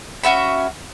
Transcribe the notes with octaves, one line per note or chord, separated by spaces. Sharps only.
C#4 F#4 E5 B5